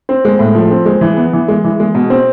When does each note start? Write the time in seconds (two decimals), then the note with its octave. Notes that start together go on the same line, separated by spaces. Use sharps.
0.09 C4
0.25 G#3
0.39 A2
0.55 F3
0.71 C4
0.86 G#3
1.01 E3
1.17 B3
1.33 E3
1.48 G#3
1.64 E3
1.80 G#3
1.95 B2
2.10 C4